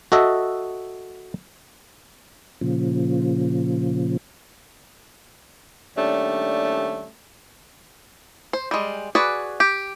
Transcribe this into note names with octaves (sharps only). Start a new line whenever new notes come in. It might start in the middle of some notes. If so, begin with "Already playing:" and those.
F#4 A4 D#5 E5
A#2 C#3 F3
D#2 G3 A3 C#4 D4
C5
G3 G#3
F#4 G#4 B4 D5
G4